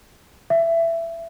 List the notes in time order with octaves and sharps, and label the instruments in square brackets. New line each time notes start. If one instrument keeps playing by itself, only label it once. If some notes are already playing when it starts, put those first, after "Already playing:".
[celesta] E5